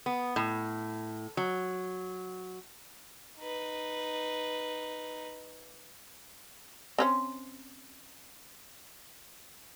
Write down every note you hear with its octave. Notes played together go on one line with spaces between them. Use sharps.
B3
A2
F#3
D#4 B4
C4 C#4 C5